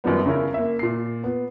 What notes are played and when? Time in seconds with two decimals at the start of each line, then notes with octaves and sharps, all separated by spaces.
0.04 F#2 D#3 F3 G3 B3
0.26 C#3 C#4 E4 A#4
0.54 A#3 E5
0.79 A#2 C7
1.24 B3